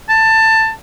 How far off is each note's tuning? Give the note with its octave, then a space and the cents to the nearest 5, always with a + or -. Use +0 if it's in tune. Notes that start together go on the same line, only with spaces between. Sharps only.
A5 +15